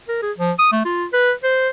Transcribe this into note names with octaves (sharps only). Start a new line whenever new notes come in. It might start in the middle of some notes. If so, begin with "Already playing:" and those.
A#4
G#4
F3
D#6
A3
F4
B4
C5